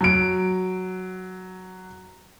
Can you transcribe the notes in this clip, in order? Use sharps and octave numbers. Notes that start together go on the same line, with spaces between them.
F#3 D7